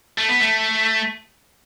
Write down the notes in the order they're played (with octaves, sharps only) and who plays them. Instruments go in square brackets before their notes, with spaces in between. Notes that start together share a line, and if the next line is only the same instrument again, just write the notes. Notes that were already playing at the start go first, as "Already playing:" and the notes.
[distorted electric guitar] A3
B3
A3